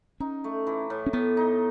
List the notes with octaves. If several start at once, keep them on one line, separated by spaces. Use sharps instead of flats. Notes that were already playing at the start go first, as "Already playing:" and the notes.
C#4 D#4
A3
E3
A2
C#4
A2 B3
D#4